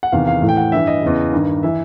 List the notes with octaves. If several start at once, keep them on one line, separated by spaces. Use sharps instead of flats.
F#5
E2 C3 D#3 F5
F5
A2 E3
G5
F#5
G2 E3 E5
D#5
E2 C#3 E3
G2 D#3
E3 E5